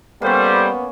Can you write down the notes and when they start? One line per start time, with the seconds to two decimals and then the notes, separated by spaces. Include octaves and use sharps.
0.22 G3 A#3 B3 C#4 A4 C5